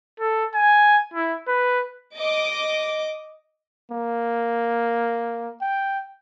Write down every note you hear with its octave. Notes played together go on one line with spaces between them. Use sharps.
A4
G#5
E4
B4
D#5 D6
A#3
G5